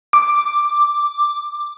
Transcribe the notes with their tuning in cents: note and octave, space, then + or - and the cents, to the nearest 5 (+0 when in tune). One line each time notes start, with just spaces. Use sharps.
D6 +5